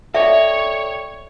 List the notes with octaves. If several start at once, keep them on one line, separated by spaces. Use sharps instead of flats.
A4 C#5 D5 E5 G5